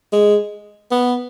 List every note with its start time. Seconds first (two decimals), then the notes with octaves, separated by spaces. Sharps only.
0.13 G#3
0.91 B3